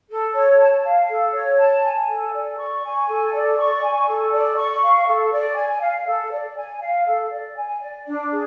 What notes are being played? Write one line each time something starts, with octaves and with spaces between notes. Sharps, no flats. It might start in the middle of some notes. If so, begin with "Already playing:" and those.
A4
C#5
A5
F5
A4
C#5
A5
G#5
A4
D5
C#6
G#5
A4
D5
C#6
G#5
A4
D5
C#6
F5
A4
D5
G#5
F5
A4
D5
G#5
F5
A4
D5
G#5
D5
D4
G#4